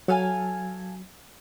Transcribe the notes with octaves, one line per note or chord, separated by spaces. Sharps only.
F#3 A4 F5 G#5